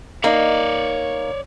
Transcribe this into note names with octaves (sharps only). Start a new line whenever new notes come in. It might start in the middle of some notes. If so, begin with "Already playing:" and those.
A#3 D#4 C#5 D5